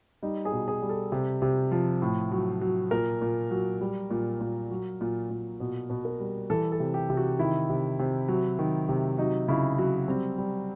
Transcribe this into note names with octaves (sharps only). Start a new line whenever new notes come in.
G3 D#4
G#4
B2
G#4
G3
A4
C3
C3
F3
A2
F#3
F#3
A#2 A#4
A#2
F#3
G3
A#2
A#2
F#3
A#2
A#2
B2
B2
A#4
G3
E3 A4
A4
C3
G4
C3
F#4
D#3 E4
C3
C3
F#3
D#3
C3
F#3 D#4
C#3 E4
F#3 F#4
G3 C4
G3